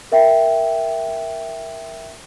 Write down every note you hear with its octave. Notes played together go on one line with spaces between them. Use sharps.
A#4 E5 G5